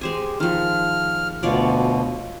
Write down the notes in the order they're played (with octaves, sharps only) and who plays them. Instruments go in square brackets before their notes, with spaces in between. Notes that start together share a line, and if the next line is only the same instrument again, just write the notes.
[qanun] G#3 C5 G#5 [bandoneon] G4
[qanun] D#3 F3 [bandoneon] F6
[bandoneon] D2 B2 [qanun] F4 C#5 D5